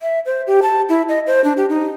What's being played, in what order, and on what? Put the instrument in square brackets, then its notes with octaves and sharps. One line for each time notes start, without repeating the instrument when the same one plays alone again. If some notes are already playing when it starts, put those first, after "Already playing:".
[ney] E5
C5
G4
A5
E4
D#5
C5
D4
G4
D#4